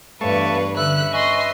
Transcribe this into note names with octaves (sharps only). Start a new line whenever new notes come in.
E2 G2 A3 B4 C#5 F5 A5 C#6
D3 C#4 B4 E5 E6 F#6
D#5 G#5 C6 C#6